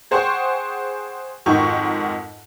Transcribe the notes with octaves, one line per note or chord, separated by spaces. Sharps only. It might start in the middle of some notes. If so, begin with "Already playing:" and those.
G#4 C5 F#5 G5 C#6
F2 G#2 D#3 F#4 G5 C#6